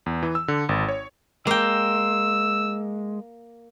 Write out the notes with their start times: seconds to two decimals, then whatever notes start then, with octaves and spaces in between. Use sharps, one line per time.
0.06 E2
0.23 E3
0.35 E6
0.48 D3
0.69 G#1
0.89 C#5
1.47 G#3 A#3 G5 E6